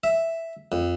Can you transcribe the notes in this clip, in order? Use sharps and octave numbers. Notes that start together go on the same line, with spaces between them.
E5
F2